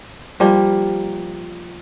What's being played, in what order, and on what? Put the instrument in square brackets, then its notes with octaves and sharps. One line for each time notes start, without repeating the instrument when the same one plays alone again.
[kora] F3 G3 A#3